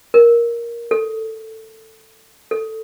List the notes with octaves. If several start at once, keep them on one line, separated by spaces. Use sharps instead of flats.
A#4
A4
A4